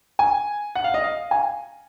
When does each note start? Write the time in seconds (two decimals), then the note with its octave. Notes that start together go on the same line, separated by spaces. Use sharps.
0.19 G#5
0.75 F#5
0.84 F5
0.94 D#5
1.04 F5
1.31 G#5